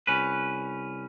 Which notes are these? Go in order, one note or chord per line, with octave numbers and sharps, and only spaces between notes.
C2 C#4 B4